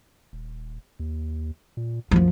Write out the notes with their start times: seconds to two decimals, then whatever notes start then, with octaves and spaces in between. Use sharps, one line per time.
0.33 D#1
1.00 D#2
1.77 A#2
2.11 C2 F#2 F3